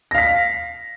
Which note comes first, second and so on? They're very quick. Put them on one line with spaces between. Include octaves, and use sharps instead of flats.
A#6 F5 B6